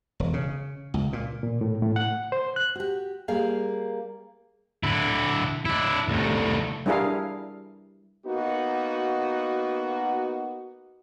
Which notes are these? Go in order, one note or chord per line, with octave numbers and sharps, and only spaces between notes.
E1
C#3
C#2
A#2
A#2
A2
A2
F#5
C5
F#6
F#4 G4
G3 A#3 G#4 F5
D3 E4
D4 E4
C2 A2
G3 D4 E4 G#4 A#4 F5
A#3 B3 D#4 F#4